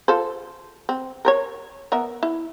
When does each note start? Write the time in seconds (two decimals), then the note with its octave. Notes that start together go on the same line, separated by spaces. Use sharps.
0.08 F4 A4 C5
0.89 C4
1.25 A#4 C5 C#5
1.92 B3 A#4 E5
2.23 E4